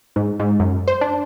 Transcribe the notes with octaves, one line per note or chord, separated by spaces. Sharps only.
G#2
G#2
F#2
C5
D4